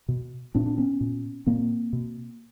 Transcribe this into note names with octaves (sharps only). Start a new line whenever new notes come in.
B2
A#2 C4 D4
D4
B3 C#4
A#2
A#2 A#3 C4
B2